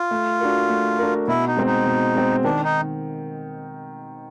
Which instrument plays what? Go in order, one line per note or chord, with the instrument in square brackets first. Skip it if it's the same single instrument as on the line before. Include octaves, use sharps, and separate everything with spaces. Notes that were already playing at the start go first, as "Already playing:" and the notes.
Already playing: [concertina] F4
[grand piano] A3
D4 F#4 A#4
A3
D4 F#4 A#4
[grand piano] B2 [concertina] E4
[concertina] D#4
[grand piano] G#3 C4
[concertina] D#4
[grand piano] B2
G#3 C4
[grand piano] D#3 [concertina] D4
[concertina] D#4